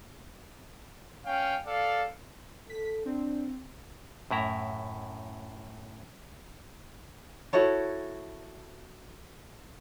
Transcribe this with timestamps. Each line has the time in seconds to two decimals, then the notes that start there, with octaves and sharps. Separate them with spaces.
1.25 C#4 F5 G5
1.66 A4 D5 F5
2.70 A4 B6
3.06 C4 D4
4.31 F#2 A2 E4 A#5
7.53 E4 F#4 A4 C#5